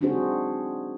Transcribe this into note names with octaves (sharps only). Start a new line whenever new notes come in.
C4 D4 D#4 F#4 G#4 C5